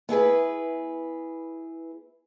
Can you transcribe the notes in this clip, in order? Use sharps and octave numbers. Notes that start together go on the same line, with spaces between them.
B3 E4 G#4 B4